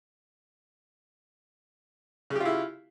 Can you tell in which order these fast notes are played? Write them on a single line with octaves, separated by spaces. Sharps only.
C#3 G4 F4 E4